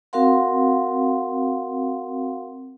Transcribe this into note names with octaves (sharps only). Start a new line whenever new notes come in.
C4 F#4 A#4 F5 F#5 C6